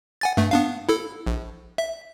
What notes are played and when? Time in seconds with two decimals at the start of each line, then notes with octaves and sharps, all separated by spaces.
0.21 F#5 G#5 A6
0.37 G2 A3
0.51 B3 D4 F5
0.89 E4 A4
1.27 A#1
1.78 E5